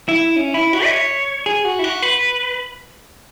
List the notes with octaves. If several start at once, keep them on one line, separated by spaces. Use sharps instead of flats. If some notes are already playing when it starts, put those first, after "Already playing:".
E4
C#4
E4
F#4
E5
C#5
G#4
F#4
E4
F#4
B4